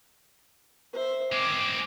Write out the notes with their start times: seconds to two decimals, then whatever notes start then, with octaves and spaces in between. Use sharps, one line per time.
0.93 C5 E5
1.32 G#3 C4 D6